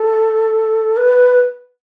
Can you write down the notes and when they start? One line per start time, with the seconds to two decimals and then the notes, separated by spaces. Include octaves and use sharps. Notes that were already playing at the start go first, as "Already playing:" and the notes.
Already playing: A4
0.97 B4